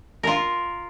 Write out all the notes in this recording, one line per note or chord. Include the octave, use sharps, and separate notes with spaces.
F4 A#4